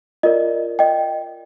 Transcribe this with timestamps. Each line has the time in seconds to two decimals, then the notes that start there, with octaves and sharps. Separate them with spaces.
0.23 F4 A#4 D5 D#5
0.79 D#5 G5